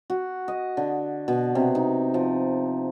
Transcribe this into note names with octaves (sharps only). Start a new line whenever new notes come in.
F#4
D#5
D3
B2
C3
D#4
F3